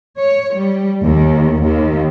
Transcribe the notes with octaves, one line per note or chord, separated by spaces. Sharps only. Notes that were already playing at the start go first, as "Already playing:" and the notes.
C#5
G3
D#2
D#2